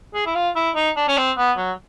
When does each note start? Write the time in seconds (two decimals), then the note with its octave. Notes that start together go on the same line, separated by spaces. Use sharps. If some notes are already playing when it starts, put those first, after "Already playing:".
0.14 G#4
0.26 E4
0.35 F4
0.56 E4
0.76 D#4
0.96 D4
1.08 C#4
1.17 C4
1.37 B3
1.57 F#3